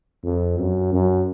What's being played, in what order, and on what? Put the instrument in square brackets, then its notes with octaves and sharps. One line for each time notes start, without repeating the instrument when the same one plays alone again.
[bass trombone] F2
F#2
F#2